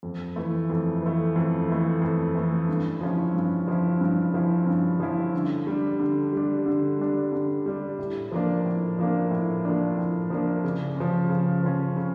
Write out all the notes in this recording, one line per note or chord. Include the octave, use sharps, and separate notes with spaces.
F2
E3 A3
F2
E3 A3
F2
E3 A3
F2
E3 A3
G2
F3 C#4 E4
G2
F3 C#4 E4
G2
F3 C#4 E4
G2
F3 C#4 E4
D3
G3 D4
D3
G3 D4
D3
G3 D4
D3
G3 D4
A2
F3 A#3 D4
A2
F3 A#3 D4
A2
F3 A#3 D4
A2
F3 A#3 D4
C#3
F3 C#4
C#3
F3 C#4
C#3